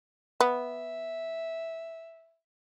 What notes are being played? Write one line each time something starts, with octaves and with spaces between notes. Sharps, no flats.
B3 E5